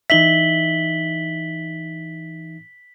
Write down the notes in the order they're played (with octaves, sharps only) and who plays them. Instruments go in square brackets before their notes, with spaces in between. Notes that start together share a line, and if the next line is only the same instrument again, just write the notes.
[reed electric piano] E3 D#4 E5 [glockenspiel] B6 F#7 G7